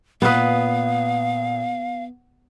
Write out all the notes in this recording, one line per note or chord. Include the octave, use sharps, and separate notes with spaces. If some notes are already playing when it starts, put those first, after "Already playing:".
A#2 B3 B4 F5 D#6